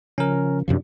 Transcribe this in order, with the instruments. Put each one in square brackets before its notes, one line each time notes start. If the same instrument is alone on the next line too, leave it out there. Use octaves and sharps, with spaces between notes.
[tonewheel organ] C#3 F3 [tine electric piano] C#4 A#4
[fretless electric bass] F#2 C3 F3 [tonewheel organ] D4